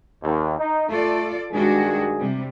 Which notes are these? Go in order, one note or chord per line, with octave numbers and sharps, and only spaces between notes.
D#2
D#4
A3 F4 A4 D5
G2 D#3 G#3 D4 F#4 G#4
C3 G3